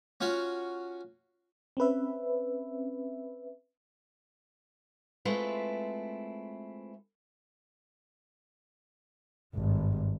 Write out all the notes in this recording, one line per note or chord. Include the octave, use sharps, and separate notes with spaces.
C#4 F4 F#4 C#5
C4 C#4 B4 E5
G#3 A3 C4 E4 F4 B4
G#1 G2